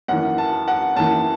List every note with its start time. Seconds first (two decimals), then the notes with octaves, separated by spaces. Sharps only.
0.08 F#2 E3 F#5
0.38 A5
0.68 F#5
0.96 F#2 E3 A5